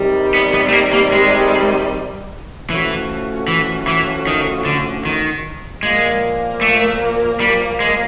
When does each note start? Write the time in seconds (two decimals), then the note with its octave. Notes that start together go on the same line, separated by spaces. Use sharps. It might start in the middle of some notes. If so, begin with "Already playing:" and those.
Already playing: C3 D#3 G3
0.34 B3
0.54 B3
0.69 A3
0.73 A#3
0.93 A#3
1.12 G#3
2.70 A2 E3 F3 A3 C#4 F#4
3.48 E3
3.87 E3
4.27 D#3
4.65 D3
5.05 D#3
5.83 A#2 F3 G#3 A#3
6.61 A3
7.40 G3
7.80 G#3